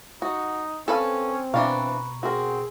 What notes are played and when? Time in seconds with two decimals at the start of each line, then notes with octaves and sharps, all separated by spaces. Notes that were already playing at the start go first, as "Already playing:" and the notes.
0.22 D#4 F#4
0.88 C4 C#4 A4 B4 F5
1.54 B2 E3 D4 B4 F5 A#5 C#6
2.23 C4 F#4 G#4 A#4